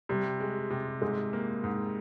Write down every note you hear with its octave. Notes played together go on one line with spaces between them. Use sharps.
C3 G3
G#3
C3
G#2 G#3
A#3
G#2